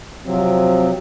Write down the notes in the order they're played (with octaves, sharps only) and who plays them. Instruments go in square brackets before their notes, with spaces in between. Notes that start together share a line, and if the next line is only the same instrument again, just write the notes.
[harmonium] C3 F3 F#3 C4